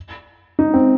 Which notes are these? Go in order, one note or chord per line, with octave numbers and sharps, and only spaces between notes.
D#4
C4